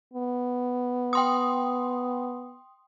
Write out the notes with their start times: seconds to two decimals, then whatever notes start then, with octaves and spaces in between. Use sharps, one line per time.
0.13 B3
1.13 G5 C6 D#6